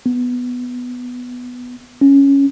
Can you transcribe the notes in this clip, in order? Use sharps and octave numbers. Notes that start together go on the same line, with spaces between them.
B3
C#4